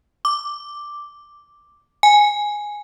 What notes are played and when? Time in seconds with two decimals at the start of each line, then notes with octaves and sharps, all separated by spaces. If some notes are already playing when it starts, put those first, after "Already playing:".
0.25 D6
2.03 G#5